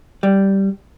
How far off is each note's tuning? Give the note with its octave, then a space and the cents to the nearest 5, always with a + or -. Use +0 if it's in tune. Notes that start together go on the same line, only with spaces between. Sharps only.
G3 -5